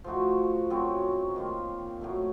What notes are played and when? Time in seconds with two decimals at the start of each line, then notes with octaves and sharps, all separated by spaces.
0.04 F3 A3 D#4 F#4
0.70 F#2 C#3 F#3 C4
1.36 D#3 A#3 F4
2.01 A2 F#3 A3